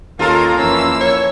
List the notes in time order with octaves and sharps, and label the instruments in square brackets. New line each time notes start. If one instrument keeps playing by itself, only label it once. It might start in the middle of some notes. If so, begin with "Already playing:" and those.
[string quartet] D#2 C#4 A#5 [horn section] A#3 [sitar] F4 A4 A#4
[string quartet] F2 E3 E6 [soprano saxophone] C#4
[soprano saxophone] C#5